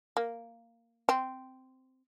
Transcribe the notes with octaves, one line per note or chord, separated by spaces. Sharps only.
A#3
C4